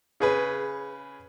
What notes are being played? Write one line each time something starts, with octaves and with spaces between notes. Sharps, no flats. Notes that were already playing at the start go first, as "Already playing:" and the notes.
C#3 G#4 B4